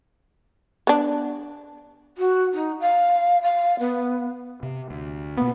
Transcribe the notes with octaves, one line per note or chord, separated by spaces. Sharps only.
B3 D4
F#4
D#4
F5
F5
B3
C3
D2
B2 A#3 B3